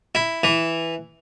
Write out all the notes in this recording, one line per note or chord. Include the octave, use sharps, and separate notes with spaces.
E4
E3